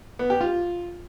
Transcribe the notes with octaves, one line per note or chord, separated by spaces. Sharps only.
B3
G4
F4